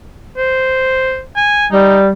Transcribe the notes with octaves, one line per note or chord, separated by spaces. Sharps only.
C5
G#5
G3 D#4